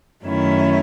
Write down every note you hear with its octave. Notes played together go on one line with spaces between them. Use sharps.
F#2 D#3 A3 C#4 E4